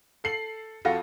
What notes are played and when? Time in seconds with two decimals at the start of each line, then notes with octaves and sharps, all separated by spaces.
0.24 A4 C7 F#7
0.85 F2 F4 F#4 A4 A#6